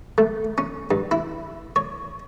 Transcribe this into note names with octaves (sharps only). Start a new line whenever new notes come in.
A3
C#4
G2
E4
C#5